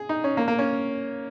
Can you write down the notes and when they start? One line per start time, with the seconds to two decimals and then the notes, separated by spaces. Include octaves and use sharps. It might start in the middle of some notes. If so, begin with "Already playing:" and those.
Already playing: G#4
0.09 D#4
0.24 C#4
0.37 A#3
0.48 A#3
0.59 C#4